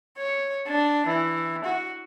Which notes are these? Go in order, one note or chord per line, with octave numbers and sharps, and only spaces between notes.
C#5
D4
E3
F#4